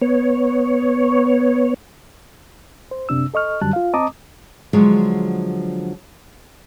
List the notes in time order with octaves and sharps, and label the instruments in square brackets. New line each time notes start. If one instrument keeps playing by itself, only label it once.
[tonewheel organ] B3 C#5
[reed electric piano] C5
F#2 C3 D4 E6
A4 D#5 C#6 F6
F#2 D3 F#3 G3 A5 F#6
F4 F5
C4 D#5 A5 A#5 D6 D#6
[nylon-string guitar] D3 F3 F#3 G#3